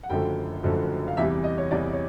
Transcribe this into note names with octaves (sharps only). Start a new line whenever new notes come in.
F#5
F#1 F#2 D3 F3 A3 G5
F#1 F#2 D3 F3 A3
F5
E2 C3 E3 G3 E5
D#5
C#5
E2 C3 E3 G3 D5
C#5